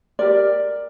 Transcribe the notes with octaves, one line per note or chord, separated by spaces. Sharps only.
G4 A#4 D5